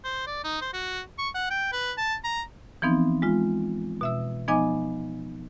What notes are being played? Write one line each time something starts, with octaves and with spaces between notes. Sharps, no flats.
C5
D5
D#4
C5
F#4
C#6
F#5
G5
B4
A5
A#5
E3 F3 B3 C4 D#4
G#3 F4
B2 E5 E6
F3 B3 D#4 D#5 G#5 D6